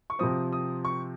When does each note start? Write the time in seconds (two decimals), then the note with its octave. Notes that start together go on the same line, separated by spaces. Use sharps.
0.10 C#6
0.19 C3 F3 C4 D#6
0.52 D#6
0.85 C#6